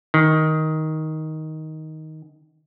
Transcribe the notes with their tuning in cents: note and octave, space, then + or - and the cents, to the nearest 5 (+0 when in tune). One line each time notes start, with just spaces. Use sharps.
D#3 +10